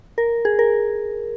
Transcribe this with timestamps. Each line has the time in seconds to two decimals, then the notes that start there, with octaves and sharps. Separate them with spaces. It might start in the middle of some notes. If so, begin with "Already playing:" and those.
0.18 A#4
0.45 G#4
0.59 A#4